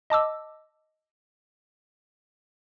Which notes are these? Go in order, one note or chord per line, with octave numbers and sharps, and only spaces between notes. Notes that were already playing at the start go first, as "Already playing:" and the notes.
D#5 A5 D6 E6